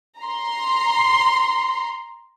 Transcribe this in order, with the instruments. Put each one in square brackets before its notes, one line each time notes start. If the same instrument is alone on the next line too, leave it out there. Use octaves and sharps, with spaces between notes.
[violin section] A#5 C6